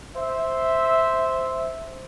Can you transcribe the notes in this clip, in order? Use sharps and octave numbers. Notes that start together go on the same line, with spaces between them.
C5 E5